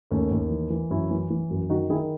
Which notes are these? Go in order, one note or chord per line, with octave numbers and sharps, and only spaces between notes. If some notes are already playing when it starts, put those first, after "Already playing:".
D#2 A3 C#4
D#2
E3
E3
F#2 C#4 E4
E3
E3
F#2
D#3 D#4 F#4
D#3 E4 G#4